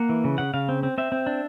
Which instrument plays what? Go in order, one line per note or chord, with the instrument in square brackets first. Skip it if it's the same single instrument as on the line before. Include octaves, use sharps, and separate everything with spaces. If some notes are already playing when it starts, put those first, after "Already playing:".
Already playing: [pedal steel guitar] A#3 F#5
E3
C#3
C#3 F#5
C#3 F5
C4
C4
C4 E5
C4
D4